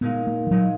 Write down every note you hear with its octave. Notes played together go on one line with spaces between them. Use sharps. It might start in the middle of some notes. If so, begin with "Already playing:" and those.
A#2 G#3 B3 D#4
A#3
F3
A#2 F#3 G#3 D#4